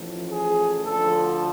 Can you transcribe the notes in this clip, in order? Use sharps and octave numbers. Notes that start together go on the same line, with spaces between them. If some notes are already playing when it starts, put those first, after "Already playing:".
Already playing: A1 A2 F3
G#4
D2 D3 F3 A4